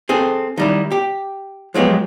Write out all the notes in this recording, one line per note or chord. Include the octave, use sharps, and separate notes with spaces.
C4 G#4 A4
D#3 G3 E4
G4
F3 F#3 G#3 B3 G4